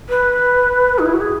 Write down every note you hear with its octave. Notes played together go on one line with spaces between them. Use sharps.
B4
D#4
E4
F#4
G#4